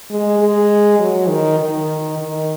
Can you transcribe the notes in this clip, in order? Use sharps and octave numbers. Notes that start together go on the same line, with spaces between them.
G#3
G#3
F#3
D#3
D#3
D#3